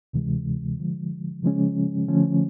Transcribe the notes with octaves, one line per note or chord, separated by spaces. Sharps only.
D2 C3 E3 G#3
D3 F3 G#3
C#3 F3 G#3 C#4
D3 F3 A3 C#4